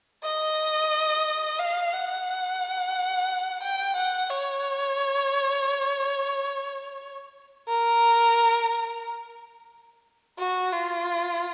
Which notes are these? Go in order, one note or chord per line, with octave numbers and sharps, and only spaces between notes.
D#5
F5
F#5
G5
F#5
C#5
A#4
F#4
F4